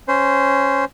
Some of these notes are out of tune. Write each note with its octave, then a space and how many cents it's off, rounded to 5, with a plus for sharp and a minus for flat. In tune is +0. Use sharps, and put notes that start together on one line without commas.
C#4 -5 C5 -15